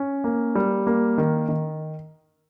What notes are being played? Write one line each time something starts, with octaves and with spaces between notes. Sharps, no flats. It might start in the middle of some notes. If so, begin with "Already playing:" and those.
Already playing: C#4
A#3
G3
A#3
D#3
D#3